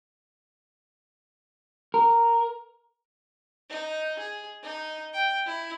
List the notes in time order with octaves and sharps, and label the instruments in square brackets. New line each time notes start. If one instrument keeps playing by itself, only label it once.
[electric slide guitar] A#4
[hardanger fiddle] D#4
G#4
D#4
G5
E4